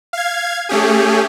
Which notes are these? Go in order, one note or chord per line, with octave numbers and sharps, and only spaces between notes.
F5 G#6
A3 C#4 G4 G#4